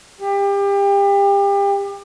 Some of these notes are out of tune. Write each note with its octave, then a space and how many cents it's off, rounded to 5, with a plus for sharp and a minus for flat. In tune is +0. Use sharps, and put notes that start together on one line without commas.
G4 +30